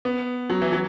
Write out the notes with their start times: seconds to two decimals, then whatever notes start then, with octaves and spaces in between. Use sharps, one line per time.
0.05 B3
0.50 F#3
0.62 E3
0.72 F#3